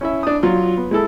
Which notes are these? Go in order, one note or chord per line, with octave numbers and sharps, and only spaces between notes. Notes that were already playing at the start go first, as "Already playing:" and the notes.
C#4 E4 E5
D4 D#6
F#3 F4
B3
G#3 E4 A4